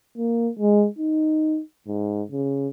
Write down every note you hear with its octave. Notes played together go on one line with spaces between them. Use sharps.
A#3
G#3
D#4
G#2
C#3